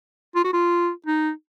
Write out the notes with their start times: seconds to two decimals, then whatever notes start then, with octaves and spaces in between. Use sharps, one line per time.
0.35 F4
0.44 F#4
0.53 F4
1.06 D#4